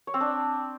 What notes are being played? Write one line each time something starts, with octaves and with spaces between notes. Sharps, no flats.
C#5
C4
D4